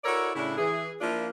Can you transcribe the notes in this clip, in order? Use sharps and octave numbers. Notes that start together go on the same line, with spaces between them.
E4 F#4 A4 A#4 C#5 D5
A2 C#3 D4 E4
E3 G#4
F3 A#3 D4 E4 F4